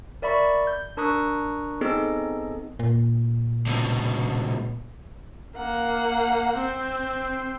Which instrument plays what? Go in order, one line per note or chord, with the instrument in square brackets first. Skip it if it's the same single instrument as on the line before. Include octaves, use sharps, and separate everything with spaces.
[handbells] A#4 D5 E5 B5 C#6
G6
D4 A#4 A#5 C#6 D#6 F#6
B3 C4 D#4 G#4 A4 D#5
[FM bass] A#2
[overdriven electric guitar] C#2 B2
[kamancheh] A#3 F#5
C4